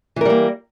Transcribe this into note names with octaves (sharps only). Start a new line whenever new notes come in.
E3 G3 A#3 A#4